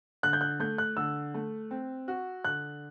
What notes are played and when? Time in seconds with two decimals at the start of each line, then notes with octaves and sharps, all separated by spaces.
0.23 D3 F#6
0.33 G6
0.41 F#6
0.60 A3 G6
0.78 F#6
0.97 D3 E6
1.34 A3
1.71 C4
2.08 F#4
2.44 D3 F#6